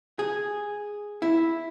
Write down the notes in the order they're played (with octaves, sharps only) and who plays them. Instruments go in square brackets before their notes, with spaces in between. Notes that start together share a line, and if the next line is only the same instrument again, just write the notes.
[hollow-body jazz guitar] G#4
E4